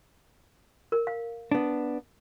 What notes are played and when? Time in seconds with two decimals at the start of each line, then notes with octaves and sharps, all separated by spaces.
0.92 A#4
1.07 F5
1.52 B3 D4